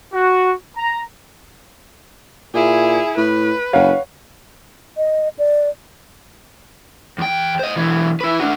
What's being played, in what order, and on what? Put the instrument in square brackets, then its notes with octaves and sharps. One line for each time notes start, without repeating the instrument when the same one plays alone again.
[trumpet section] F#4
A#5
[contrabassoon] A#2 [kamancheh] E4 G#4
[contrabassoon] A2 [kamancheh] B4
[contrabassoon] F#1 [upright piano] C#5 F5 F#5
[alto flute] D#5
D5
[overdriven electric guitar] E2 G5
C5 D#5
B1 E3
E4 B4
D4 F#4